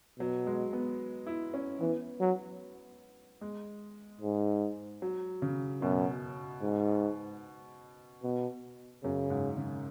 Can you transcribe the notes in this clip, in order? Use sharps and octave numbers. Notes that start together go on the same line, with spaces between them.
B2 F#3
G#3
B3
E4
C#4
E3 B3
F#3
G#3
G#2
F#3
C#3
F#2 B2
G#2
B2
F#2 C#3
G#2
C#3